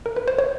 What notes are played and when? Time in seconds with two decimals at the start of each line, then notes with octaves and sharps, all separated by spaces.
0.06 A#4
0.16 B4
0.28 C5
0.39 C#5